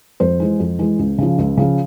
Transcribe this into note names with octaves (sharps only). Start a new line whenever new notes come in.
F2 C5
E3 G#3
F2
E3 G#3
C#2
C#3 F3
C#2
C#3 F3